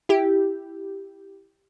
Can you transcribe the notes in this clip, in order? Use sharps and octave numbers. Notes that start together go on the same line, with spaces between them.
E4 G4